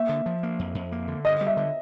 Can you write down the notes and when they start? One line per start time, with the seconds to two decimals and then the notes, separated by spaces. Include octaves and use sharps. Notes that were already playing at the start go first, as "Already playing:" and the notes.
Already playing: A#3 E5
0.09 D3
0.26 F3
0.43 A#3
0.59 F2
0.75 F2
0.92 A#3
1.08 D3
1.25 G2 D#5
1.41 G3
1.47 E5
1.57 D3